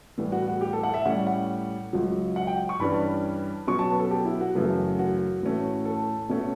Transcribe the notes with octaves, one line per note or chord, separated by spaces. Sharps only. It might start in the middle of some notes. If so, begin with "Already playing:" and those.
A2 E3 G3 B3
F#4
F#4
G4
A4
F#5
E5
A2 G3 C#4 F#5
F#5
C#2 C#3 F#3
F#5
G5
C#6
G2 E3 G3 C#4 B5
B2 F#3 C#4 C#6
A5
B4
A4
G4
E4
F#4
F#2 C#3 E3 A3
F#4
A2 E3 A3 C#4
A4
B2 A3 C#4